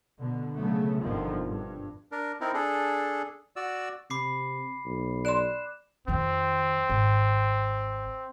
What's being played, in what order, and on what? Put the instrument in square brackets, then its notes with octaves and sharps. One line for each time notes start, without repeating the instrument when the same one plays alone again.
[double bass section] B2 D3
C#3 F#3 A3 B3
G1 F2 B2 D3 D#3 F3
G2
[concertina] D4 A#4
C4 D#4 E4 A#4
D4 G#4 A4
F#4 D5 E6
[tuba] C3 [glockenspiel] B5 D6 C7
[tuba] B1
[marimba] D5 C6 [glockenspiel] F#6 E7
[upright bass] F2 D#3 [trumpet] C4
[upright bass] G#1